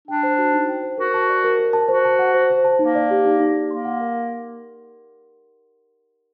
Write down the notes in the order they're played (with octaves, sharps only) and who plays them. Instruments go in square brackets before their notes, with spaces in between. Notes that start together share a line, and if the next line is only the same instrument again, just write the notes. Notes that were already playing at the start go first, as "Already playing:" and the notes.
[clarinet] D4 [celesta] G5
[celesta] C5
F#4
D#4
G5
C5
[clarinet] F#4 [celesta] A#4
[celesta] A5
D5
A#4
A#4
A5
[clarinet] F#4 [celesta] C5
[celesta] A5
F#5
C5
C5
A5
[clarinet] A#3 [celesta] D#4
[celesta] D5
G4
D#4
D#4
D5
[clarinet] A#3 [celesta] C6
[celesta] F#5
A#4